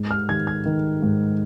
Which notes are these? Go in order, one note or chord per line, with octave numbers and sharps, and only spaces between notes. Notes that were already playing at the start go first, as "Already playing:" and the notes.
Already playing: G#2
F6
D#3 G#6
G#6
D#3
G#2